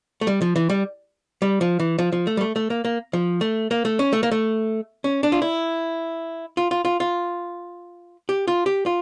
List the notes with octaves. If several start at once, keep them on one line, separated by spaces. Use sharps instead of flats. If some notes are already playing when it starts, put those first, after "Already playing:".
A3
G3
F3
E3
G3
G3
F3
E3
F3
F3
A3
G3
A3
A3
A#3
A#3
F3
A3
A#3
A3
C#4
A3
A#3
A3
C#4
D4
F4
E4
F4
F4
F4
F4
G4
F4
G4
F4